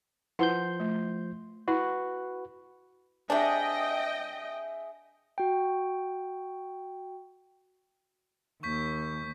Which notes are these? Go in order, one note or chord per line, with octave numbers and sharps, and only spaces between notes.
F3 E4 B4 F#5 C6 G6
A3
E4 F#4 B4
C3 D4 G#4 D#5 E5 F#5 G5
F#4 G5
D#2 C#6 G6 B6